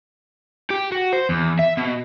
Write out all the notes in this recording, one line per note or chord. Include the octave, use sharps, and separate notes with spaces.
G4
F#4
C5
E2
E5
B2